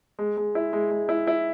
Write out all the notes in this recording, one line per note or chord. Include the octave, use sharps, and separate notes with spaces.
G#3
G#3
E4
G#3
G#3
E4
E4